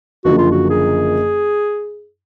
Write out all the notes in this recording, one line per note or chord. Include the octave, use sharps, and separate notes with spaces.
F#1 F#2 D3 F3 F#4
F4
F#4
G#4